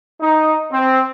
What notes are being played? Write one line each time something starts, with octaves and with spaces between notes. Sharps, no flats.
D#4
C4